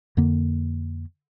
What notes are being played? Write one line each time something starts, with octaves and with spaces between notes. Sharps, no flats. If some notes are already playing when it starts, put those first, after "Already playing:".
F2 D3 A#3